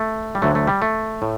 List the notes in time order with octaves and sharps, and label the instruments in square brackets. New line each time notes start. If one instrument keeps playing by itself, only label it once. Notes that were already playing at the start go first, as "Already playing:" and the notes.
Already playing: [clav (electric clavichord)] A3
G3
D2 D3 F#3 A3
A3
G3
A3
A2